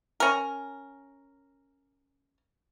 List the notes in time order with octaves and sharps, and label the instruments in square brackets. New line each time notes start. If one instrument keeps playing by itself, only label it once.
[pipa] C#4 A#4